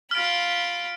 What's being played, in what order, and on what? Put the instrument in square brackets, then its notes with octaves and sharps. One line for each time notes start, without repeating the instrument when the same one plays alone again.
[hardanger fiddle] F4 B5 [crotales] F6 D7